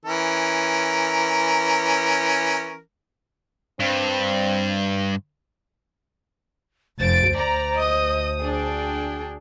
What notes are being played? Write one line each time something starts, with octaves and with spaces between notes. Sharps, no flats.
E3 C#4 A#4
G2 C4
F1 C5 A6 D7
D2 D5 A#5
D#5 D#6
D4 G#4 G5